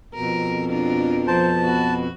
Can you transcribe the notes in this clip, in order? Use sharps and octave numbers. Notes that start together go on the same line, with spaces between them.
F2 B2 A#4
D4 F4 A#4
F3 C5 A5
B3 F#4